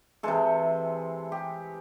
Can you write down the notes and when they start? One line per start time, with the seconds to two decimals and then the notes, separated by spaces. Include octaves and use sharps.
0.23 C3 E3 G#3 A4
1.32 G4